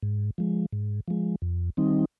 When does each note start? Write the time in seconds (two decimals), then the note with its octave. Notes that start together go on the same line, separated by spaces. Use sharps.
0.03 G#2
0.38 F3 G#3
0.72 G#2
1.08 F3 G#3
1.42 F2
1.77 D#3 G3 C4 D#4